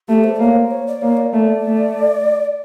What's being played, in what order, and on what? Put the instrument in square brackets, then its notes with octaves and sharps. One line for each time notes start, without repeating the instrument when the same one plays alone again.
[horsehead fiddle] A3 [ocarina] G4
[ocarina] C5
D5
[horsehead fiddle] A#3 [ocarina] C#5
[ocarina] C5
C#5
D5
[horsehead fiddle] A#3 [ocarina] C#5
[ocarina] D5
[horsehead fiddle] A3 [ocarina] D5
[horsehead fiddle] A3